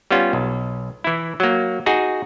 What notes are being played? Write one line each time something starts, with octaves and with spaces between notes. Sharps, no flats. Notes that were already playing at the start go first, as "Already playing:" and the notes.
G3 B3 C#4 F4
B1
E3 E4
F#3 A#3
D#4 F#4 G#4